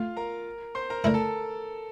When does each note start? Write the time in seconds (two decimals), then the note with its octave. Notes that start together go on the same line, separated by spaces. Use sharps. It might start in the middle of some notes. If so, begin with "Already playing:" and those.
Already playing: A3 F4 F5
0.17 A#4 A#5
0.75 C5 C6
0.90 A#4 A#5
1.04 D3 A3 E4 A#4 A#5
1.14 A4 A5